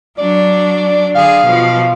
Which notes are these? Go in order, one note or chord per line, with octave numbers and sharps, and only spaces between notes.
F#3 D4 D5
D3 G#4 F5
B2 F3